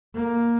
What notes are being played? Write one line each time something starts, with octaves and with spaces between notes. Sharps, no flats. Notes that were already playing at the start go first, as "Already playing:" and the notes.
A#3